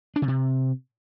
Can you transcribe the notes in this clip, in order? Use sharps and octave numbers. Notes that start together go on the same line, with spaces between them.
D4
C#3
C3